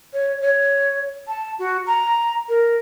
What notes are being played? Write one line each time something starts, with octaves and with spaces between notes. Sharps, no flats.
C#5
C#5
A5
F#4
A#5
A#4